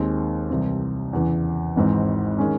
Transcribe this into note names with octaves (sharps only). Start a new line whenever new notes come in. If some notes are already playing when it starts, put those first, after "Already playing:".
Already playing: D#2 D#3 G#3 C4
C2 C3 E3 C4
E2 C#3 E3
G#1 G#2 E3 C4
D#3 G#3 C#4